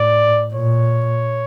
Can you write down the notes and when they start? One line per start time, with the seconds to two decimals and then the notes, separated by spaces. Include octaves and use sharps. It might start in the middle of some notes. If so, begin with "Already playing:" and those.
Already playing: A2 D5
0.54 A#2 C#5